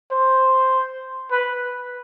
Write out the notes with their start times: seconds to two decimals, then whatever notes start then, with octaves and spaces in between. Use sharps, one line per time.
0.12 C5
1.31 B4